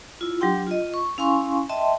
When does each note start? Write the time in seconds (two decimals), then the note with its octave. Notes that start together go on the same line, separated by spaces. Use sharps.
0.21 E4 F4
0.41 F#3 D4 G4 G5 C6
0.67 F4 D#5
0.94 C#6
1.18 C#4 E4 F5 G#5 C6 C#6
1.69 D#5 E5 G5 A5 C6